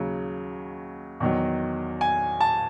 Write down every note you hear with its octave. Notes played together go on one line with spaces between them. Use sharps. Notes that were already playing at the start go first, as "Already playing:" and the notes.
Already playing: D#2 C#3 F#3
E2 D#3 F#3
G#5
A5